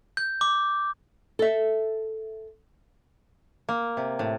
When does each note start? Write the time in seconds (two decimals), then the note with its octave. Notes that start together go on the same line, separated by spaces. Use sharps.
0.17 G6
0.41 D6
1.39 A4 E5
3.69 A#3
3.97 C3
4.19 A2